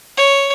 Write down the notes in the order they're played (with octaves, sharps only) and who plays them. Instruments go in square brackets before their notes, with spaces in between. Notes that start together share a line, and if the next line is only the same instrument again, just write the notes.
[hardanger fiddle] C#5